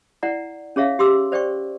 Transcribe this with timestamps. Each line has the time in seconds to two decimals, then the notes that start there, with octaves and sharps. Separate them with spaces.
0.23 E4 D5 F#5 A#5
0.76 C#4 G#4 C#5 E5 F5
0.99 G4 C6 D6 E6
1.32 C5 D5 G5 C#6